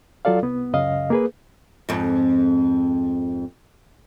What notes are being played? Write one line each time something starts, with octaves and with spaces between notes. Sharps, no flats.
F#3 F4 A4 D5 F5
C2 B3
C#2 F#2 C#3 D#5 F5
A#3 G#4 B4
F2 G#2